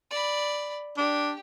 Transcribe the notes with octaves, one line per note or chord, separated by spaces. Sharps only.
D5 B5
D4 G4